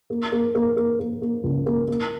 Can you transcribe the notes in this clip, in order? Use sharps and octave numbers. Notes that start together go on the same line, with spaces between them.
A#3
A#3
A#3
A#3
A#3
A#3
C#2
A#3
A#3